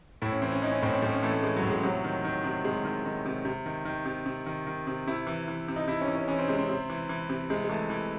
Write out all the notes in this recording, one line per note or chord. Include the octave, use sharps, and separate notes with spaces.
A2 E4
C#4
E3 C4
C#4
E3 D#4
C#4
A2 C4
C4
A2 C#4
C#4
E3 A3
A3
E3 G#3
F#3
A2
G#3
C3 F#3
D#3
D#3
C3
C3 G#3
D#3
D#3
C3
C3
D#3
D#3
C3
C3
D#3
D#3
C3
C3 E4
E3
E3
C3
D#4
C3 E4
C#4
E3
C#4
E3 C#4
C4
C3 G#3
C4
C3
E3
E3
C3
C3 G#3
G#3
E3 A3
E3